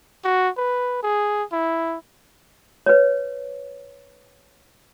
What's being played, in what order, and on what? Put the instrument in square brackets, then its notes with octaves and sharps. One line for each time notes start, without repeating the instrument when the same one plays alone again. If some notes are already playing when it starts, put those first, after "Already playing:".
[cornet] F#4
B4
G#4
E4
[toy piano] B4 C#5